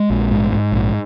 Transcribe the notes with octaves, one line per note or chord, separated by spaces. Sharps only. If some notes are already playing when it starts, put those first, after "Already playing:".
Already playing: G#3
A#1
G#2
G#2
A#1